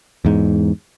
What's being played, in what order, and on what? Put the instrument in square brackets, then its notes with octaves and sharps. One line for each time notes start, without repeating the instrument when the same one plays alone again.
[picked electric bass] E2 G#2